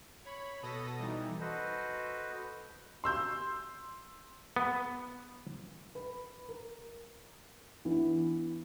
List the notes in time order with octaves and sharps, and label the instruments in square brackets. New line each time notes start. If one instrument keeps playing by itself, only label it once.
[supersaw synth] C#5 B5
B2 A4 D#6 A#6
E3 G3 D#4
[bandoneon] F#4 A4 B4 C5 D#5
[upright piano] C6 E6 G6
[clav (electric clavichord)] B3
[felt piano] B4 B5
A#4
E3 B3 D4 E4